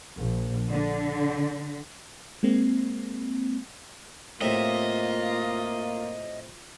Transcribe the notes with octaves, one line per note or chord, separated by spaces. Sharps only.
A#1
D3
G#3 A#3 C4
A2 C3 A#3 E4 F4 D#5